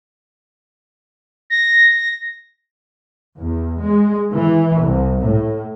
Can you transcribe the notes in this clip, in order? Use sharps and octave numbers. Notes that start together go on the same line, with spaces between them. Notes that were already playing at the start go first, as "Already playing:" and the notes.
A#6
E2
G#3
E3
C2
A2